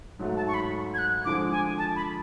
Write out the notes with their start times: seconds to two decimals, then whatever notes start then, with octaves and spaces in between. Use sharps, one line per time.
0.19 G#2 F#3 A3
0.37 A5
0.48 C#6
0.54 B5
0.94 G#6
0.98 F#6
1.25 D3 F3 G#3 D6
1.51 G#5
1.78 A5
1.96 B5